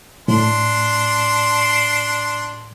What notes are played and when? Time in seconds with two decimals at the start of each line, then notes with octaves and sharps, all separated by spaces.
0.28 A2 D4 C6